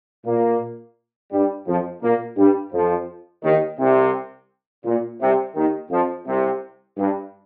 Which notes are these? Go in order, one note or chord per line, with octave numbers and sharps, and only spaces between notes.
A#2 A#3
G2 G3
F2 F3
A#2 A#3
G2 G3
F2 F3
D#2 D#3
C2 C3
A#2
C2 C3
D#2 D#3
F2 F3
C2 C3
G2